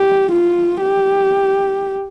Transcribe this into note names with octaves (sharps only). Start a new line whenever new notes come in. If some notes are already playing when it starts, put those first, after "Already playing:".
Already playing: G4
F4
G4